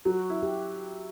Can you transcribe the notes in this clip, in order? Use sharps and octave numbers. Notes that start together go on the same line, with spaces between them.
F#3 F#4
E4
G4